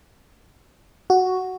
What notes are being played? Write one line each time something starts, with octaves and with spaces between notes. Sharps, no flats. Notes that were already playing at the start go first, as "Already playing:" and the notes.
F#4